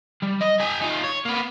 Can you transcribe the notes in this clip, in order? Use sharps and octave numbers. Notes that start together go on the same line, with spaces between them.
G3
D#5
G4 G#5
D#4 F4
C#5
A#3 B3